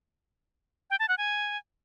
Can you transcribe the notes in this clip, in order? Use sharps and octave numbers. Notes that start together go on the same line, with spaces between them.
G5
A5
F#5
G#5